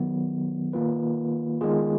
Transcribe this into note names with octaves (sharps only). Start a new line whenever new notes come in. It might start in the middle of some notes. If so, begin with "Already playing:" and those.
Already playing: D#3 F#3 B3
D#3 A#3 F4 B4
D#3 G#3 B3 F4 G#4